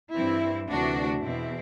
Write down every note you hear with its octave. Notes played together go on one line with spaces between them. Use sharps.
G2 E3 C4 E4
D2 C3 E3 D4 F#4
E2 B2 C4 E4